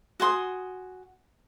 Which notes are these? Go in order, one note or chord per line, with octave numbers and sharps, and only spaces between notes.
F#4 G#5 C6 D#6